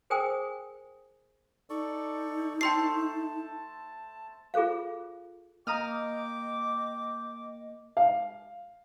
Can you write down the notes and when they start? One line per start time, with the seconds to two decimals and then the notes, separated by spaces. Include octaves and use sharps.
0.10 G#4 A#4 C5 G5 G#5 D#6
1.70 D#4 A4 D5 C#6
2.61 A3 A4 C5 G5 A5 C6 C7
4.54 F4 G#4 A4 C5 F5
5.67 A#3 D#5 G5 A#5 D6 D#6 F6
7.97 F5